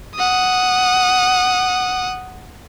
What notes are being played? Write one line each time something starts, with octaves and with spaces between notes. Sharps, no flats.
F#5 D#6